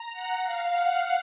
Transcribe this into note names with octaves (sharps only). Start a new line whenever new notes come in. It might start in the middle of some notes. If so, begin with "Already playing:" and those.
Already playing: A#5
F#5
F5
F#5